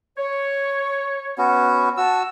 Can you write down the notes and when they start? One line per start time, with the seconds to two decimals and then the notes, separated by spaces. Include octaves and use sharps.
0.17 C#5
1.38 B3 C#4 F#4
1.97 F#4 A5 E6